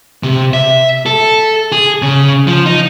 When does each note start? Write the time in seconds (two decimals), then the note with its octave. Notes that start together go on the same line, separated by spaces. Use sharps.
0.23 C3
0.53 E5
1.06 A4
1.72 G#4
2.02 C#3
2.47 F3
2.66 D#4